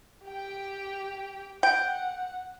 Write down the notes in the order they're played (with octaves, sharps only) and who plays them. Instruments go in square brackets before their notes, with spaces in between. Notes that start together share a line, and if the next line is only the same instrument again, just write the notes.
[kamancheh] G4 G5
[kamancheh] F#5 [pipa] G5